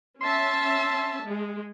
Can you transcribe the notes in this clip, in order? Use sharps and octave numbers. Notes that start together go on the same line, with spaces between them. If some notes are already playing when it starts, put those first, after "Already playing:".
C#4 E5 A5 C6
G#3